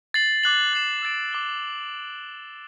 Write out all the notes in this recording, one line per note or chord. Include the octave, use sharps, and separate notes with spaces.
A6 C7 F#7
D6 F#6 C7 F#7
F#6 C7 E7
E6 A6 D7
D6 A6 C7 G7